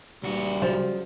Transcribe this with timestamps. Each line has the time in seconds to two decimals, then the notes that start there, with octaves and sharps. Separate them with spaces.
0.23 C#2 G3 F#4
0.62 C#3 F3 F#3